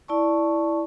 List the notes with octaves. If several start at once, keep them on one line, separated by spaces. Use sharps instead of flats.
E4 D5 A5 C#6